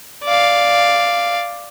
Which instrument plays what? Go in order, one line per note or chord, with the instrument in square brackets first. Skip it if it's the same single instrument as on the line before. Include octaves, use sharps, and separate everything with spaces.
[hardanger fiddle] D5 F5